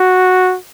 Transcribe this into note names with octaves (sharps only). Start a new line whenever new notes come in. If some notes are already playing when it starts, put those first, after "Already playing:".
Already playing: F#4